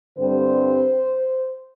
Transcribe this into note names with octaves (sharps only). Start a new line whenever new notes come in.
G2 D3 G3 C4 C5